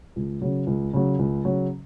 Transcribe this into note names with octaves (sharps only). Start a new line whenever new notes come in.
C#2
C#3 F#3
C#2
C#3 F#3
C#2
C#3 F#3